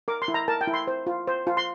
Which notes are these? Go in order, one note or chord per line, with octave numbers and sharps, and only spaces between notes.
A#4 D6
C6
E4
A#5
A#4 A5
G5
E4
C6
C5
F4
C5
F4
C6